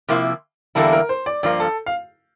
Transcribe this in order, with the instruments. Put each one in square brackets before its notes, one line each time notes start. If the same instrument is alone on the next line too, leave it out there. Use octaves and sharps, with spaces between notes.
[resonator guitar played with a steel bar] C3 F3 A#3 E4
[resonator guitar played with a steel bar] E2 D3 G3 A#3 E4 [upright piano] A4
[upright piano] A#4
C5
D5
[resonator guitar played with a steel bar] G2 F3 A#3 [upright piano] D5
[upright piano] A4
F5